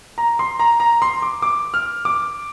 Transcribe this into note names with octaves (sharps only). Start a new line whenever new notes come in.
A#5
C6
A#5
A#5
C6
D6
D6
F6
D6